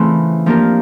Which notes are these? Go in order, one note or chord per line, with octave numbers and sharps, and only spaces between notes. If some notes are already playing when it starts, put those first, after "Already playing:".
Already playing: C#3 E3 A3 C4 F4
F3 A#3 D4 G4 A#4